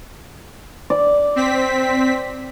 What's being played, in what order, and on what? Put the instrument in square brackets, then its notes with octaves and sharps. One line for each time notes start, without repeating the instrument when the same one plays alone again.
[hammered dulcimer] D5
[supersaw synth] C4 B6